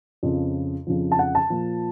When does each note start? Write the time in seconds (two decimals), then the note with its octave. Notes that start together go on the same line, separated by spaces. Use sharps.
0.23 F2 C#3 F3
0.87 F2 C#3 F3
1.12 A5
1.19 F#5
1.35 A5
1.50 A#2 F3